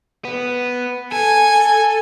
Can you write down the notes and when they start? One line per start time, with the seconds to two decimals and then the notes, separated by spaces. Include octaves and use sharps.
0.25 B3
1.12 A4 G#5